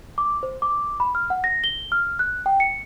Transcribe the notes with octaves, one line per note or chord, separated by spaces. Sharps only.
D6
C5
D6
B5
F6
F#5
A#6
G7
F6
F#6
G5
C#7